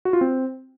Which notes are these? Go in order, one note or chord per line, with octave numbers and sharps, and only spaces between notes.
F#4
F4
C4